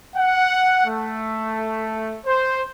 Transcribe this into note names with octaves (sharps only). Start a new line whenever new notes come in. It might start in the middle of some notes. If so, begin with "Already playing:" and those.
F#5
A3
C5